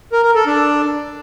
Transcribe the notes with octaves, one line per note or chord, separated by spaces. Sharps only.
A#4
A#4
A4
D4